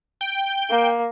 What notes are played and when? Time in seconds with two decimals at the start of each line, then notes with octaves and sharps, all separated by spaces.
0.21 G5
0.70 A#3